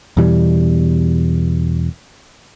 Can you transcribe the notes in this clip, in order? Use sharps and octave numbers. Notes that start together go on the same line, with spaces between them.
E2 B2 E3 G3